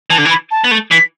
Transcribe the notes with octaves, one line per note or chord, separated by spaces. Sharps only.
E3 A5
D3
E3
B5
A5
B3
A3
E3 B6